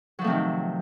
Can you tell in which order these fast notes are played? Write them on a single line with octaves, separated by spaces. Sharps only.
F#3 F3 A3 C3 D#3